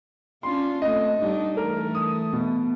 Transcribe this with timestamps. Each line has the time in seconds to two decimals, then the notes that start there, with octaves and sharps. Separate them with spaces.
0.43 C#4 D4 F4 C6
0.82 A3 C4 D#5
1.18 G2 D4 D#4
1.57 E3 A3 A#4
1.95 D#6
2.33 B2